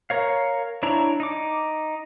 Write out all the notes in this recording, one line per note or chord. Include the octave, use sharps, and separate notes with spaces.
A#4 C#5 F5
D4 E4 C#5 A5 A#5
D#4 D6